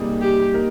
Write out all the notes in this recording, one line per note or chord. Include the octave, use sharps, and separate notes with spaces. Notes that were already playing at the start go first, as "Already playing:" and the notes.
Already playing: C3 G3 A#3 D#4 G#4
G4
A#3 D#4 A#4